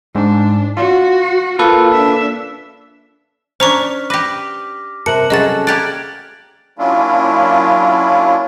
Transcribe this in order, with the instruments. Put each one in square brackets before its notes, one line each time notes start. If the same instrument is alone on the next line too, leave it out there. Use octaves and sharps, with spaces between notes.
[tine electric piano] G#2 [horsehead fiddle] D4
[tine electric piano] F4 [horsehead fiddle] F#4
[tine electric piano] A#3 A4 B4 [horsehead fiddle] F4
[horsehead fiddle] D4 E5
[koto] C#4 D4 [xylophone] C5 A#5 C#6 [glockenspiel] F6 B6
[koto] G4 B4 [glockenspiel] D6 A#6
[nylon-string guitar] C3 A#4 [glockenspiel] A5 F#6 F#7 [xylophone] C#7
[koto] C3 F#3 [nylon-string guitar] C#4 G#4 A4 [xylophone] D#5 A6 [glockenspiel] F#7
[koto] A#3 G4 D5 [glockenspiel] F#6 G#6 D7 [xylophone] A6
[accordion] F#3 A#3 C#4 D4 E4 F4